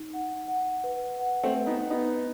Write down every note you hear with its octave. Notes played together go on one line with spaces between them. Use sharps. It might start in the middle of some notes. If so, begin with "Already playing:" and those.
Already playing: D#4
F#5
F#5
B4
F#5
A3 C4
B4
B3 D#4
B3 D#4 B4